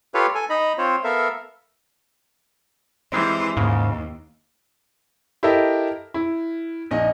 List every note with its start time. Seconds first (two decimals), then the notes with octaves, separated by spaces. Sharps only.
0.14 F4 G4 A4 B4 C#5 F5
0.35 A4 G#5
0.50 D#4 D#5 A#5 B5
0.78 C4 F4 C5 C#5
1.04 B3 A4 A#4 E5 F5
3.12 E3 G3 G#3 C4 C5
3.57 D#2 G#2 C#3
5.43 E4 G4 A4 A#4 D#5 E5
6.14 E4
6.91 A#1 D#4 D#5